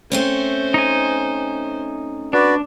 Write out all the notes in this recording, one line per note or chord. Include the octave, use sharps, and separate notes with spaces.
A3 C4 C#4 C5
D#4 G#5
D4 F#4 B4 D5